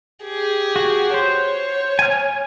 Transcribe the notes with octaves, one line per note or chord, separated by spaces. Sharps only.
G4 G#4
F#4
C5 C#5
G#5 F6